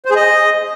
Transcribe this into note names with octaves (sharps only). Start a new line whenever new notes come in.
C5
G#4
D#5